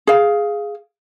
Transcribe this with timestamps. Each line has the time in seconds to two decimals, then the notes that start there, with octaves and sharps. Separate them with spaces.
0.07 G#4 F5